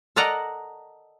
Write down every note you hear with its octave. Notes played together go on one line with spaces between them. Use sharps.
A4 A#4 D5 D#5 F#5 A#5